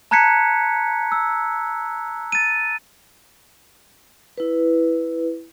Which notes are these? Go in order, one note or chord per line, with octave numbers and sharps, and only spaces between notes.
A5 A#5 F#6 G#6 B6 C#7
E6
A6 D#7
E4 B4